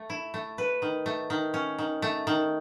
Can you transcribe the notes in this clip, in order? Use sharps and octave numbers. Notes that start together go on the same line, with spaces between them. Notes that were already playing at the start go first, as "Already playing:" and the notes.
Already playing: A3
E4
A3
B4
D#3
A3
D#3
C#4
D#3
A3
D#3